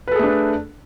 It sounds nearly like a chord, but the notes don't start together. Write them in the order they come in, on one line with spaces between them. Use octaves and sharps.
B4 A4 G#4 A3 D4